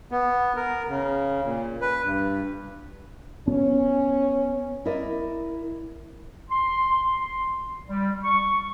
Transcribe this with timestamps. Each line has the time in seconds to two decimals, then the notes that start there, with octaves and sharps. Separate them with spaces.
0.11 B3
0.56 A#4
0.88 C#3
1.45 A#2
1.81 B4
2.05 G2
3.48 B3 C#4
4.85 E4 A#4 D5 D#5
6.51 C6
7.84 G3
8.23 C#6